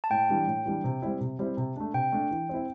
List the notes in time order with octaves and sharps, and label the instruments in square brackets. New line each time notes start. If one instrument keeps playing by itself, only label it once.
[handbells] A5
[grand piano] A2 [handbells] G5
[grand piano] E3 G3 D4
A2
E3 G3 D4
C3
G3 C4 E4
C3
G3 C4 E4
C3
A3 D4
[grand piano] C3 [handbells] G5
[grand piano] A3 D4
E3
C4 E4